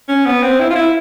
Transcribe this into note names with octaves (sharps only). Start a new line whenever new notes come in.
C#4
B3
C4
E4
F4
E4